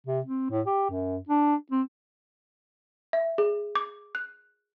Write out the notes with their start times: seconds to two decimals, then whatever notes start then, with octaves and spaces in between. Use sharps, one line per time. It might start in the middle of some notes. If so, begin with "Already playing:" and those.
0.07 C3
0.26 C4
0.51 A2
0.66 G4
0.90 F#2
1.29 D4
1.72 C4
3.13 E5
3.38 G#4
3.76 D6
4.15 F#6